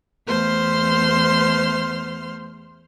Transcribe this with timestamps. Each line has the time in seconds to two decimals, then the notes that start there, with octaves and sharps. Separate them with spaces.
0.27 E2 A3 B3 C5 C6 F6